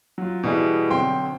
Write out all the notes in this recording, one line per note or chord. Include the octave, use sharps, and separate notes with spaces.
F#3 F4
B2 E3 G3 B3 E4 G#4
B1 D3 C4 G5 C6